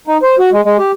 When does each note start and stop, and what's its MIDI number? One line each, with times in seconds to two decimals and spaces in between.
0.07 0.17 63
0.23 0.35 72
0.39 0.50 66
0.52 0.61 56
0.65 0.77 56
0.78 0.92 67